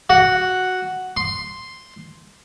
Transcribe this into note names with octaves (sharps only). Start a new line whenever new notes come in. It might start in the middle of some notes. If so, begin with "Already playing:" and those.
F#4
C6